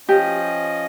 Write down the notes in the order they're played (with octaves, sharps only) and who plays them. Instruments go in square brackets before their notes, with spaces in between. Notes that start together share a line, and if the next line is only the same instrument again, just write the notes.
[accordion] F3 C#4 D#5 [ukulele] G4